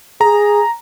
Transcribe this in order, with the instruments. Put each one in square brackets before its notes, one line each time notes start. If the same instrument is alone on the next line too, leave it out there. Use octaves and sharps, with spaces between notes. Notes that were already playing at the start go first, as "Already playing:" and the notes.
[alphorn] G#4 [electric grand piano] A#5